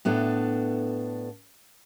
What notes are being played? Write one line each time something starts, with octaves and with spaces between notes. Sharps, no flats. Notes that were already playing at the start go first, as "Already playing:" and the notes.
A2 B3 D4 A4